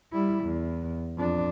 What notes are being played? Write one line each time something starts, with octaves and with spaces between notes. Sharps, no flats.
G3 E4
E2
F2 D4